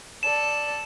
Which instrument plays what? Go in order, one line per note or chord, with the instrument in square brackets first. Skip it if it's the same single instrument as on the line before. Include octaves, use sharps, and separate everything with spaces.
[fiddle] A4 D5 [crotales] E7